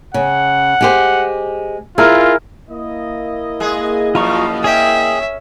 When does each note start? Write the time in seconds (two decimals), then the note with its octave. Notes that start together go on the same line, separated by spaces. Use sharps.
0.14 C#3 F#5
0.81 G#3 G4 C5
1.98 E4 F4 G#4 A#4
2.69 A#3 E4 D#5
3.60 G#3 G#4
4.15 F#2 B2 F3 F4 A#5 C#6
4.64 C#4 G#4 E5 G5